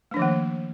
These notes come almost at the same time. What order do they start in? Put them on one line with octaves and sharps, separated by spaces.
A3 D4 F3 D#3 A#3